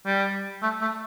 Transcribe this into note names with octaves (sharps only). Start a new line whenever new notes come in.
G3
A3
A3